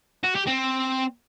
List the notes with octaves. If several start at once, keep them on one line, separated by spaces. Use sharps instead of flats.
F#4
G4
C4